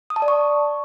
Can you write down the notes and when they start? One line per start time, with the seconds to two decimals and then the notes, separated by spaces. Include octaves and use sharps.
0.10 D#6
0.16 A5
0.22 D5
0.28 C#6